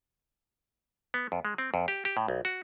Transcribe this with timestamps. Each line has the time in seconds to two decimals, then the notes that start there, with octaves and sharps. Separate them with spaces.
1.14 B3
1.32 F2
1.45 G#3
1.58 C4
1.74 F2
1.88 G4
2.05 G4
2.17 A2
2.28 B1
2.45 F#4